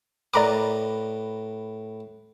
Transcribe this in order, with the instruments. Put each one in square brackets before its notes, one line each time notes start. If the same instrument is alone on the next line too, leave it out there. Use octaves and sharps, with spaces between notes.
[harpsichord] A2 A#4 B4 [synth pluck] D5 A#5 D6